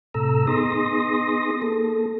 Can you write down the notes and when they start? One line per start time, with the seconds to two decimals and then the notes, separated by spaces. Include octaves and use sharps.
0.14 A2 C3 A4 A#5 E6
0.47 B3 D#4 G#4 C6 D#6 A#6
1.62 A#3 A4